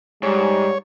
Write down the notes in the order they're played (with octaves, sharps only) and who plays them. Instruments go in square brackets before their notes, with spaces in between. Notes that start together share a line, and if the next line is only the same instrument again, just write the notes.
[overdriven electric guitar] G#2 [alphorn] G3 [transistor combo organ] C#5